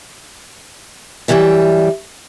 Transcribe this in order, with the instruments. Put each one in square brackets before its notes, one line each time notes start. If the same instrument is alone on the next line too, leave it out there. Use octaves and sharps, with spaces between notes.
[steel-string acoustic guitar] F#2 C#3 E3 G3 E5